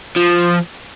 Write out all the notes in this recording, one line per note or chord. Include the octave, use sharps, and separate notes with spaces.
F3